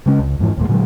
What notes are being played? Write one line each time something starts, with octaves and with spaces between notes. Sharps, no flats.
C#3 G#3 C#4
C#2
F2 G#2 E3
D#2 A#2 G#3
A#2 D3 F#3 G#3